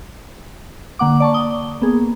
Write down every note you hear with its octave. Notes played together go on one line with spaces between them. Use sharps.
D3 A#3 F#5 D6
D5 A5 C#6
D#6 G7
A#3 B3 G#4